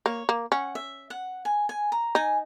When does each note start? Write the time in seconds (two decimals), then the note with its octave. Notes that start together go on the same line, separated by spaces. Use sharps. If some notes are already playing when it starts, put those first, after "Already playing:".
0.06 A#3 C#5
0.29 A#3
0.52 C#4 F#5
0.75 E5
1.10 F#5
1.45 G#5
1.69 G#5
1.92 A#5
2.15 D#4 G#5